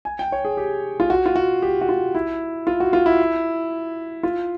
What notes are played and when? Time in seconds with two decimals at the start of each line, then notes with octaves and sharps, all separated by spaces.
0.05 G#5
0.19 G5
0.32 C#5
0.45 G#4
0.57 G4
1.00 F4
1.10 F#4
1.26 F4
1.36 F#4
1.62 G4
1.81 F#4
1.89 F4
2.15 E4
2.67 F4
2.80 F#4
2.93 F4
3.06 E4
4.23 F4